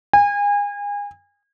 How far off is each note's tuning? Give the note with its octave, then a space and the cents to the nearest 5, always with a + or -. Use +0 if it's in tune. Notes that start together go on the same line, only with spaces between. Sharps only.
G#5 -30